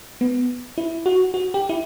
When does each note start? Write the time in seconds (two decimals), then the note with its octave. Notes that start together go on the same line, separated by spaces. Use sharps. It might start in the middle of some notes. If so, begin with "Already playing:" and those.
0.21 B3
0.78 E4
1.06 F#4
1.34 F#4
1.54 G4
1.69 E4